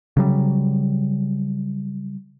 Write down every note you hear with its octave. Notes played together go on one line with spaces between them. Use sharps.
C#3 F#3 G3